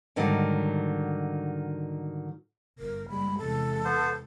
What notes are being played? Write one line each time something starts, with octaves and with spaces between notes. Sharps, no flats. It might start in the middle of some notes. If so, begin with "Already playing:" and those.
G#2 D3 D#3 F#3 G3
G1 A#4
F#1 G3 G#3 B5
E2 C3 G#3 A4
B3 C5